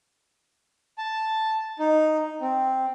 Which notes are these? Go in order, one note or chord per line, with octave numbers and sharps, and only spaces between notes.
A5
D#4
C4